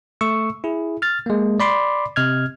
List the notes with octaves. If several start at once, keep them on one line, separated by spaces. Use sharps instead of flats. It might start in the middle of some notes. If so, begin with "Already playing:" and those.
A3 C#6 E6
E4 G#4
F6 A6
G#3 A#3
D5 B5 C6 D6
C3 D#5 F6 G#6